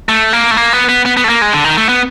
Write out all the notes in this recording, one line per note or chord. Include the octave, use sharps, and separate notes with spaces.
A3
A#3
A3
A#3
B3
B3
B3
B3
A3
A#3
G#3
D3
D#3
A3
B3